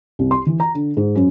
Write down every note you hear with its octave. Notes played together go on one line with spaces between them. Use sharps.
C2
C6
E3
A#5
D3
G#2
F#2